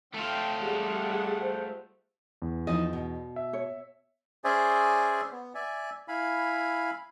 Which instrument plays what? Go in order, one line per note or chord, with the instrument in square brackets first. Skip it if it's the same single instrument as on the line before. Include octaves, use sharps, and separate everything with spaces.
[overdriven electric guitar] A3 F4 [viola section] G5
[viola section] G3 G#4 F#5 [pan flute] G4
[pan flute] C5
[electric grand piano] E2
[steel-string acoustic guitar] F3 D#4 E4 [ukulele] D#5
[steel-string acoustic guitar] B2
[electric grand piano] E5
[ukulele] C#5
[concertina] C#4 G#4 C5 D5 E5 G#5
B3
D5 E5 G#5
E4 F5 G#5 B5